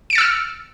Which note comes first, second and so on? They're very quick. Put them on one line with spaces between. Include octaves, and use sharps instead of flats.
D7 C#7 A6 E6 F6